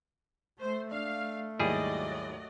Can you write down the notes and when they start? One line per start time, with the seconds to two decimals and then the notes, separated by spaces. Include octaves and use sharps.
0.60 A3 C5
0.91 D4 F5
1.60 D#2 G#2 F#3 G3 E4 G#4 D5 D#5